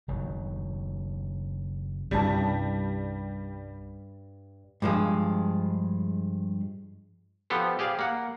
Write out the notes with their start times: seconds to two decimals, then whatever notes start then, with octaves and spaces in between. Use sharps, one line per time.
0.08 F#1 D#3 F#3
2.11 C2 G2 C#3 G3 A5
4.82 G2 F3 G#3
7.50 F3 B3 G4 A4 C5
7.79 G4 G#4 D5 F5
7.99 A#3 F#5